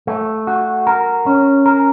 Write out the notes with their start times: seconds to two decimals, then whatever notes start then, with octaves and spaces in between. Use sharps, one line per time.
0.07 A3
0.47 F#4
0.87 A#4
1.26 C#4
1.66 A#4